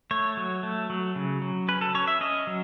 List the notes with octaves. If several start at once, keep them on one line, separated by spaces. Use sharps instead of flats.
A3 C#5
F#3
A3
F#3
C#3
F#3
C#4 B4
A4
C#4 C#5
E5
C#4 D#5
F#3